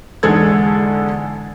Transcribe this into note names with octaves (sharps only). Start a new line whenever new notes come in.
E2 G#2 D3 G#3 A4 G#6